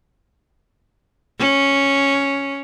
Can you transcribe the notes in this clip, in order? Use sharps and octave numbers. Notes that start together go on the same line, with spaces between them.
C#4